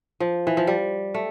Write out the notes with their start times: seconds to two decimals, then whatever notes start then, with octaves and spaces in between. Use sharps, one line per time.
0.20 F3
0.47 E3
0.57 F3
0.67 G3
1.14 A3